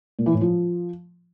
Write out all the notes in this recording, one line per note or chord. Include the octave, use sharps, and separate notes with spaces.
A#2
E3
A2
F3